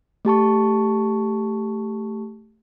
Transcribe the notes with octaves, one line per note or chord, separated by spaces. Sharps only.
A3 G4 A5 C#6